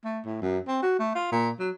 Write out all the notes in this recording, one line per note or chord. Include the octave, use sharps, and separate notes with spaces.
A3
A2
F#2
C4
F#4
A3
F4
A#2
F#3